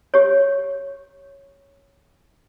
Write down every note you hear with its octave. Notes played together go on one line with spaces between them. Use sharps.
G4 C#5